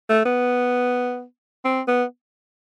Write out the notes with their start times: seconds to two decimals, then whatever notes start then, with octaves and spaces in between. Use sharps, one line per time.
0.09 A3
0.25 B3
1.65 C4
1.88 B3